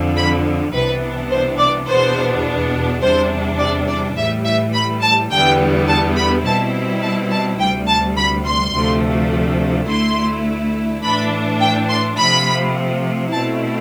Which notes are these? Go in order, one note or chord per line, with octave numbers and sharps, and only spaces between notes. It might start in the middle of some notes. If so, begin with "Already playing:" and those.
Already playing: F2 D3 F3
B5
C2 C3 E3 B3 D4 B4
C5
D5
E2 B2 B3 D4 C5
E2 C3 G3 D4 C5
D5
D5
A2 E3 G3 E5
E5
B5
A5
E2 D3 G3 B3 G5
A5
B5
B2 G3 C4 E4 A5
A5
A5
D2 C3 G3 G5
A5
B5
C6
D2 C3 F3 A3
D2 D3 A3 E4 C6
A2 E3 A3 D4 B5
G5
C6
C3 F3 A3 B5
B2 A3 C4 E4 A5